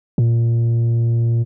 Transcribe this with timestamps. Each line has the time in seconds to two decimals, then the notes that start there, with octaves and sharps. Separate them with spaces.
0.18 A#2